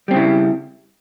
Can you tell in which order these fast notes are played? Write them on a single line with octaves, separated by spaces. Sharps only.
G3 C4 C#3 E4